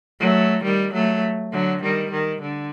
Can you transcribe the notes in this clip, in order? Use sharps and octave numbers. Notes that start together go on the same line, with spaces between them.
F#3 A3
D#3 G3
F#3 A3
D3 F#3
D#3 G3
D#3
D3